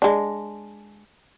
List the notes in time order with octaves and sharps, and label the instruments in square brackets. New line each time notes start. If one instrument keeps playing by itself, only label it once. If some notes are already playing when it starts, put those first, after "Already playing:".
[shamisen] G#3 D4